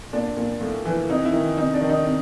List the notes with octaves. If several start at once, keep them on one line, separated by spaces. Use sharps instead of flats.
A#2 D4
A#2
A2
E3
C3 D#4
E4
D#3
C3 D#4
D4
D#3
D#4
C3